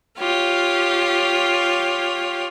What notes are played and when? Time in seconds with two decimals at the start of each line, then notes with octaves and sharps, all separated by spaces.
0.18 F4 G4 C#5